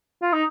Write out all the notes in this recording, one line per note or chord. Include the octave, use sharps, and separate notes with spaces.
F4
D#4